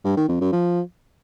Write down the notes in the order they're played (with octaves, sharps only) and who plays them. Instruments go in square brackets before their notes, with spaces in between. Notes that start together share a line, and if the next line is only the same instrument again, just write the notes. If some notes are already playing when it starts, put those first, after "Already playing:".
[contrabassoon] G2
D#3
F2
F#2
F3